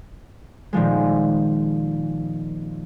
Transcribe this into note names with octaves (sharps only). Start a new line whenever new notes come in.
A#2 D#3 F3 G#3